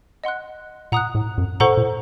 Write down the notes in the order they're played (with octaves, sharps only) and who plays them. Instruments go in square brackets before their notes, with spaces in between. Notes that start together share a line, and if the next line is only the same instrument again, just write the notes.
[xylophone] D#5 F#5 C6 F#6
[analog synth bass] A#2 [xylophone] F#5 A#5 D#6 F#6
[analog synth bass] A2
F#2
[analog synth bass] A#2 [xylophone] A4 C5 F#5 A#5 C#6
[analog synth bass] A#2